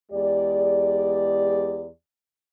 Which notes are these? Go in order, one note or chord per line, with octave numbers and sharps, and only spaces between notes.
E2 G#3 G4 D5